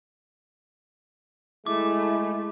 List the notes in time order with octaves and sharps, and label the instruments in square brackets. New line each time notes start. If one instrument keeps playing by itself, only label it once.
[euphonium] G#3 [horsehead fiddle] A3 [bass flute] E4 [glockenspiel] D6